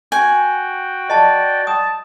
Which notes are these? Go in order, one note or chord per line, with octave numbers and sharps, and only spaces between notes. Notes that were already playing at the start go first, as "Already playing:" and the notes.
F#4 G5 G#5
D5 D#5 A5
A5 D#6